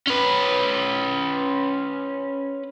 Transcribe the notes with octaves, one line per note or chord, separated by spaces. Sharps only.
C#4 B4